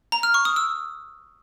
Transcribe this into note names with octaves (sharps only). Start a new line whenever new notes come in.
A#5
F6
C#6
D#6
E6